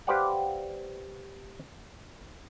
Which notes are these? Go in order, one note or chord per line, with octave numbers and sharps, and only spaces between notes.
G4 B4 C5 D5 F5 F#5